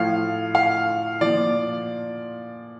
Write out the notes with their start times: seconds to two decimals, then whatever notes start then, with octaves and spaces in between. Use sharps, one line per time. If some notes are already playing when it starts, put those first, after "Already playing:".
Already playing: A2 F3 F5
0.55 F5
1.21 A#2 F3 D5